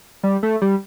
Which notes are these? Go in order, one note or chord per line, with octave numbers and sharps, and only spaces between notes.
G3
A3
G3